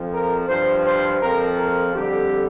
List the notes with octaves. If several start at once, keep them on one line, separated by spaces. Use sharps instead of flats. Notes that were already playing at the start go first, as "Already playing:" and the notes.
Already playing: F2 F3
A#4
G2 F3 C5
C5
F2 F3 A#4
A#4
F2 D3 G3 G4